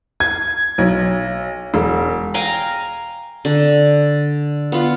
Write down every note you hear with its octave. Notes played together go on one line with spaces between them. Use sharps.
G#6
B1
E1
F5 G5 G#5 A#5
D3
B3 F4